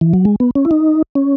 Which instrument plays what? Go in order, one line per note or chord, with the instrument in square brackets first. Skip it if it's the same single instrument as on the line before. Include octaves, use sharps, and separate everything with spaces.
[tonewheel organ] E3
F#3
G#3
B3
C#4
E4
D#4
C#4